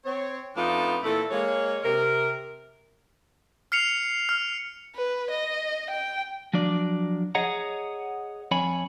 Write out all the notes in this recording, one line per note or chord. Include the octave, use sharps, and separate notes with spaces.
C4 C#5
F2 A3 B3 D4 D#4 F4
A#2 E3 A3 E4 A4
G#3 A#3 C#5
C3 A#4
F6 C7 C#7 F7
F6
B4
D#5
G5
F3 F#3 D4 D5
G#4 C#5 D#5 F#5 A#5
F2 C#5 G#5 B5